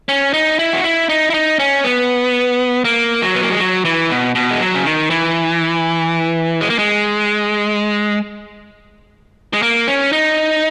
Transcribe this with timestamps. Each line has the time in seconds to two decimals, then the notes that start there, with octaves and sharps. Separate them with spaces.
0.09 C#4
0.34 D#4
0.59 E4
0.73 F#4
0.84 E4
1.09 D#4
1.30 E4
1.34 D#4
1.59 C#4
1.84 B3
2.85 A#3
3.22 F#3
3.35 B3
3.43 A#3
3.51 G#3
3.60 F#3
3.85 E3
4.10 B2
4.35 B2
4.51 G#3
4.61 F#3
4.75 C#3
4.86 D#3
5.10 E3
6.61 G#3
6.70 A#3
6.79 G#3
9.54 G#3
9.62 A#3
9.88 C#4
10.13 D#4